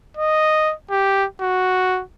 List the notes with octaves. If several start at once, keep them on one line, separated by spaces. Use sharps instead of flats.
D#5
G4
F#4